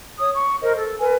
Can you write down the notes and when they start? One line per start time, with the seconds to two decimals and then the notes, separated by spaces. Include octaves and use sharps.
0.18 C#5 D#6
0.35 C#6
0.62 A#4 C5 D#5
0.76 A4
0.99 A#4 B4 G#5